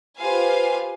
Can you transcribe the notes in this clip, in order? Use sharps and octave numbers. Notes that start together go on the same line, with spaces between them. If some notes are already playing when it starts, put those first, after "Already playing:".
F4 G4 B4 C5 F5 G#5